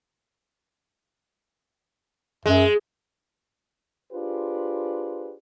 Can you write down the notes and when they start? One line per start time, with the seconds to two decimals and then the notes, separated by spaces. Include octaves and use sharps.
2.46 F#2 G#3
4.13 D4 F4 G4 G#4 B4 C5